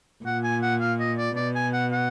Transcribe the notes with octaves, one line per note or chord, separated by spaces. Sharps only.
A#2 F#5
G#5
F#5
F5
D#5
D5
B2 D5
G#5
F#5
F#5